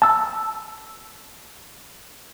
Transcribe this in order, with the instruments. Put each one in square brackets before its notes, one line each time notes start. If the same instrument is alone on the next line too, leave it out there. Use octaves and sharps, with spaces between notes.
[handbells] A5 E6